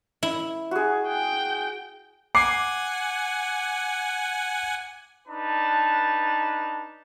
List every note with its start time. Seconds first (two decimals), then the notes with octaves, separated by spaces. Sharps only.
0.23 E4
0.71 F#4 G#4
1.08 G5
2.35 F#5 G#5 D6 C7
5.27 D4 D#4 B4 A5